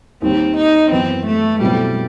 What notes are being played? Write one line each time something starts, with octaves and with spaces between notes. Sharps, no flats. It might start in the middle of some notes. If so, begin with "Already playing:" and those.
D#2 D#3 G3 C4
D#4
F#2 E3 B3 C4
A3
B2 F#3 G3 C4 E4 A4